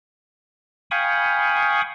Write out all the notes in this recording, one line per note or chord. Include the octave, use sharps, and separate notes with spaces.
F5 G5 G#5 B5 C#6 D#6